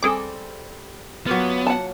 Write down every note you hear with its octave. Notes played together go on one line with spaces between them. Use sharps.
G3 C4 G#4 A4 D6
F#3 A#3 B3 F4
F#5 A5